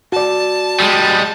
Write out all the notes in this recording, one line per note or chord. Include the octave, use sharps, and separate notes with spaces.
F#4 D5 A5
G3 G#3